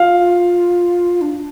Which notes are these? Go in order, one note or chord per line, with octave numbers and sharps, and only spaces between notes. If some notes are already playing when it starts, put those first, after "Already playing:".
Already playing: F4 F5
D4